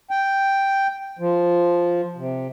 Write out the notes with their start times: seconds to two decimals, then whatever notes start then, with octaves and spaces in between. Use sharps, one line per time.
0.11 G5
1.19 F3
2.16 C3